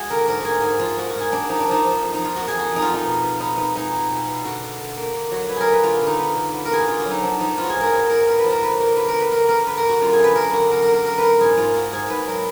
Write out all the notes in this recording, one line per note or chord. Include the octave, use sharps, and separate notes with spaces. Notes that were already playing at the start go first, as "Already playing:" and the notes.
Already playing: G#3 F#4 G#4
D3 A#4
G#2 A#4
A#3 F#4 G#4
G#2 G#4
F3 F4
A#3 F#4
G#2 F#4
G#4
A#3 D4
F3 D#4
D4
F3 D#4
F3
F2
D#4
F2
F4
A#3 F#4
G#4
F2
F#4
F2 D#4
F4
F2
D#4
B2
B3
B3 D#4
B3 D#4
G#3 D#4
G#3
B2
B2
D3 F#4
D3
D3
A#3
D3
F#3 F#4
F#3 B4
G#4 A#4
A#3
B4
D3 F4
D3
D#4
B3
D3
B3
A#4
B3 G#4
F#4
D3 F4
F#4
F#3
D#4
F3 D4
F3 D#4
B3 F4
F#4
G#4
G#2
A#4
G#2 G#4
G#2 A#4
B3 A#4
B4
F3
A#4
D3 B4
D3 A#4
D3 B4
A#4
B3
B4
D3 A#4
B3 A#4
D3 B4
A#4
D3
F#4
F#2 F4
G#4
D3
B4
F#2 A#4
D3 F#4
F#2 A#4
A#4
A#3
A#4
F#2 A#4
F#2 A#4 B4
G#2 G#4
G#2 F4
A#3 F#4
G#2 G#4
G#2 B4
F#3 A#4